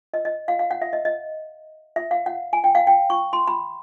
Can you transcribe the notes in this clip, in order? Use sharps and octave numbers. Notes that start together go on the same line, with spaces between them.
D#5
D#5
F5
F5
F#5
E5
D#5
D#5
E5
F5
F#5
G#5
G5
F5
G5
C#6
C6
B5